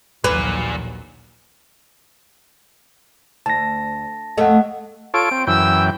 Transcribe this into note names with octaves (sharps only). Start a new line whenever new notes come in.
A#1 D#2 A#2 F#3 B4
D2 A5 A#6
F2 A3 A4 D#5 F#5
F4 A4 C#5 D7
C4
F#2 E3 G5 E6